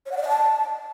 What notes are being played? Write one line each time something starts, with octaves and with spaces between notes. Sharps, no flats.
C#5
F#5
D5
D#5
A5